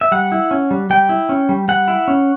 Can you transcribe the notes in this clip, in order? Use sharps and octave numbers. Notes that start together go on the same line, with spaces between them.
E5
G3 F#5
E4
C#4
G3
G3 G5
E4
C#4
G3
G3 F#5
E4
C#4